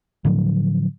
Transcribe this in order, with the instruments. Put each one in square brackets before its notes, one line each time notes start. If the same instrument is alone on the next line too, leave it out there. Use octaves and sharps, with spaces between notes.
[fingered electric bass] A2 D3 F3 F#3